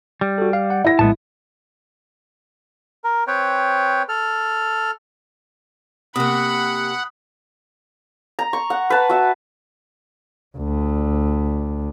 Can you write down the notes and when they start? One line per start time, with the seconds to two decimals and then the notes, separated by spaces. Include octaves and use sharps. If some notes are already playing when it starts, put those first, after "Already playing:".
0.21 G3
0.38 F#4 A4
0.53 F5
0.70 F#5
0.84 E4 A#6
0.99 A#1 A2 G#3 B3 A5
3.04 A#4
3.27 C4 B4 C#5 G5
4.09 A4 F6
6.16 C3 A#3 F#5 B5 D#6
8.39 A#5
8.53 C#6
8.70 F#5
8.90 B4 A5
9.09 F#4 E5
10.58 D2